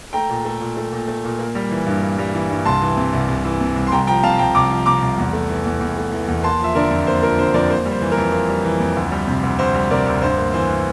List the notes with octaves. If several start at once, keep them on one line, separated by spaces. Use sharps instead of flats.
A3 G5 A#5
A#2
A3
A#2
A3
A#2
A3
A#2
A#3
G3
E3
G2
A#3
G3
E3
G2
C2 A5 C6
E3
C3
C2
C2
E3
C3
C2
C6
C2 G5 A#5
F3 G5 A#5
C3 F5 A5
C2 G5 A#5
C2 A#5 D6
F3
C3 A#5 D6
C2
E2
A3
E3
E2
E2
A3
E3
E2
A#3 A5 C6
F3 E5
D3 A#4 D5
F2
A#3 C5
F3 A#4
D3 C5
F2 A#4 D5
A#3 C5
G3
C5
E3
A#4
F2
A#3
G3
E3
F2
D2
G3
C3
D2
D2 C5
G3
C3 A#4 D5
D2
G2 C5
A#3
E3 C5